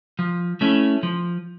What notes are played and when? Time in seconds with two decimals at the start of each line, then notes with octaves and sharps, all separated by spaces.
0.19 F3
0.61 A3 C#4 E4
1.03 F3